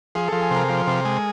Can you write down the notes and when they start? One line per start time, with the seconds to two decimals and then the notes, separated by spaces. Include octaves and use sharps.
0.15 F3 G#4 G#5
0.28 F3 A4 A5
0.42 G#4 G#5
0.51 C3
0.56 A#4 A#5
0.69 F3 A#4 A#5
0.87 C3
1.05 G#3